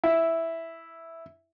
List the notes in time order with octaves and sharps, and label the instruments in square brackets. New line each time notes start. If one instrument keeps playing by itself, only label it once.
[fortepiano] E4